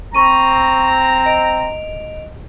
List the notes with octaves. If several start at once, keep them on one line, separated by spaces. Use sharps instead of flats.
C4 A#5 B5 C#6 D#7
D#5 D7 F7